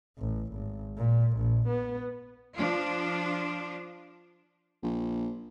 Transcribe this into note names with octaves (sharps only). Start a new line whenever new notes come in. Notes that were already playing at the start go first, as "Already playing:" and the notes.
A1
G#1
A#2
A#1
B3
F3 D4 F4
A#1